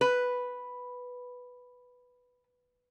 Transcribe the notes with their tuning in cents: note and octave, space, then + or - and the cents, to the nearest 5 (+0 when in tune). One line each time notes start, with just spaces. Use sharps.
B4 +0